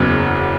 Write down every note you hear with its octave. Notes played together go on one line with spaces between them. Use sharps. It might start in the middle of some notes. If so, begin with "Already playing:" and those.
Already playing: F#1 E2 C#3 F#3